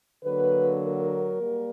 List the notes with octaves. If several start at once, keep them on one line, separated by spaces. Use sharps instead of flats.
D3 F#3 A#3 B4
A#4
G3 A#3